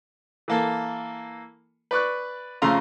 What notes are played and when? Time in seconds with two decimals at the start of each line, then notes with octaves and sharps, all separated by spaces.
0.48 E3 A#3 A4
1.91 B4 D5 C#6 F#6
2.62 F2 C#3 A3 F5 A#5 C6